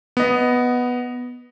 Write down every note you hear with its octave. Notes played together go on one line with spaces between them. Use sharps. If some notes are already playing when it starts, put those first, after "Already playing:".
B3 D#5